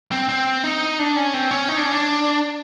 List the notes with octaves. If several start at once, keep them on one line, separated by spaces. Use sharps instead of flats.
C4
C4
D#4
D4
C#4
C4
C#4
D#4
D4
C#4
D4